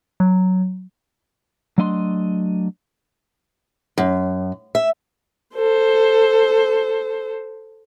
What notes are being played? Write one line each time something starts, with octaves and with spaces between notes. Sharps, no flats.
F#3
F#3 A3 D4 D#5 E5 C6
F#2
E5
A4 C5